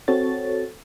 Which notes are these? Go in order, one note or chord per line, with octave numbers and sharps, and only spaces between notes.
C4 F#4 A4 C#5 A6